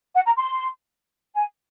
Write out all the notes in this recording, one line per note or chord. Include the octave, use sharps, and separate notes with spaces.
F#5
A#5
C6
G#5